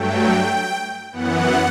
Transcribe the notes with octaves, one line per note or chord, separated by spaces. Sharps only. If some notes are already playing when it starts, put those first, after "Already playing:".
Already playing: G2 F#3 A3 G5
F#2 E3 B3 F#5